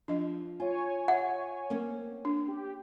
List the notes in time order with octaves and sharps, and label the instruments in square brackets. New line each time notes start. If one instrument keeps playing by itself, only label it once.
[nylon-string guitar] F3 [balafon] D4 D#5
[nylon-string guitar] F4 [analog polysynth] C#5 G#5
[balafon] E5 [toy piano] F#5
[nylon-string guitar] A#3 C4 C#4
[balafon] D4
[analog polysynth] G4